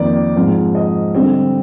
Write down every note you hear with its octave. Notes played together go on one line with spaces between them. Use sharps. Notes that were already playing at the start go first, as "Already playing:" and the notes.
Already playing: F2 D#3 A#3 D5
G#2 F3 C4
D#5
D3 G3 C4